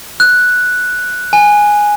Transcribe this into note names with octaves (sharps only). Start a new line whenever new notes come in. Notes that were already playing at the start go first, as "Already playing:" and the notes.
F#6
G#5